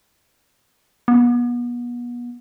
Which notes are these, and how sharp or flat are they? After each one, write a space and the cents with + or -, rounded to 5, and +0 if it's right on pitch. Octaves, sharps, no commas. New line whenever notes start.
B3 -35